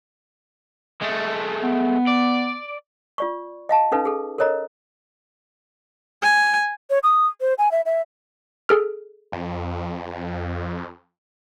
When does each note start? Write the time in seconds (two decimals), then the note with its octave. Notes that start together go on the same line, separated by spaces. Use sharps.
1.02 G#3 A3
1.63 B3
2.08 D5
3.18 F4 D5 C#6
3.69 D#5 F5 A5
3.92 C#4 D#4 A4 B4 F5
4.05 G#4 A4
4.38 A4 A#4 C#5 D#5 A#5
6.23 G#5
6.90 C#5
7.03 D#6
7.41 C5
7.58 G#5
7.71 E5
7.86 E5
8.69 G#4 A4 F6
9.32 F2